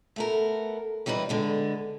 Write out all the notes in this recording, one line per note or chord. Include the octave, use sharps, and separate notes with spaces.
A3 B3 A#4
E3 G3 D#4 A#4 B4
D3 G#3 B3